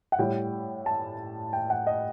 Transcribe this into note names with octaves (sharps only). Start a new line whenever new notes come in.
F#5
A2 G3 G5
A5
G5
F#5
D#5